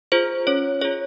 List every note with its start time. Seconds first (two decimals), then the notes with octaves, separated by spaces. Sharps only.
0.12 F4 G#4 C5
0.47 C#4 C#5
0.81 F4 G#4 C#5